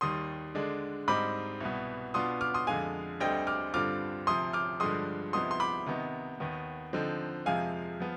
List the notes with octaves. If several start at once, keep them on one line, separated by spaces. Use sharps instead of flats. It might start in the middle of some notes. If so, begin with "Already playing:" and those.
D#2 D#3 G3 C6 D#6
D3 G#3 D4
G#2 G3 C4 D#4 B5 D6
C2 B2 B3
B2 B3 D4 F4 C6 D#6
D6 F6
C6 D#6
F2 D3 G#3 F5 G#5
D2 D3 G3 C4 D#5 G5
D6 F6
G2 D3 G3 C4 F4 D6 F6
D2 C3 F3 C6 D#6
D6 F6
G2 D3 F3 G#3 C6 D#6
C2 C3 F3 B3 D#4 C6 D#6
C6
B5 D6
C3 D#3 B3 D#4
D#2 D#3 B3
D3 F3 C4 D#4
F2 C3 F3 G#3 F5 G#5
F3 B3